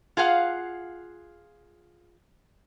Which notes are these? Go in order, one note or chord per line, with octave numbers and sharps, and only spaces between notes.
F4 G#4 F5 F#5